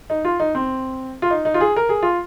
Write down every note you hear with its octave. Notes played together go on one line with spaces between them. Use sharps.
D#4
F4
D#4
C4
F4
D#4
D#4
F4
G#4
A#4
G#4
F4